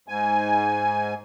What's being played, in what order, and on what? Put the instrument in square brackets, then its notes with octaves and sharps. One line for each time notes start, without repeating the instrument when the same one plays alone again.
[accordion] G#2 G#5